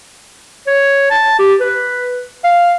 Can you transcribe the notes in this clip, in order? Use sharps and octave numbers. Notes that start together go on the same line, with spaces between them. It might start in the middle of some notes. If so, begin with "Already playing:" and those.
C#5
A5
G4
B4
F5